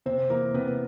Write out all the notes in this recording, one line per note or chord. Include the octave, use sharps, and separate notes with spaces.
C3 C4 C5
E3 A#3 A#4
C3 B3 B4
B4